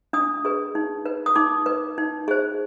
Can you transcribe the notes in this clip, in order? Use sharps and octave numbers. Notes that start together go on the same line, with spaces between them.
D4 D#6
G#4 B4
D#4
B4
D#6
D#4 D6
B4
D#4
G#4 C5